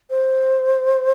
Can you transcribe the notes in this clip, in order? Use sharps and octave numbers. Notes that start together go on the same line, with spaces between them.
C5